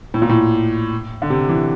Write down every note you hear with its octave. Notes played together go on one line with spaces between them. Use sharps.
A2
A#2
A2
D3
C3
E3